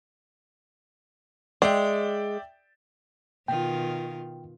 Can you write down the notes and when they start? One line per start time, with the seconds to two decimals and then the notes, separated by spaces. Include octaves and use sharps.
1.62 G#3 D5 E5 G5
3.48 B2 D#3 F4 G5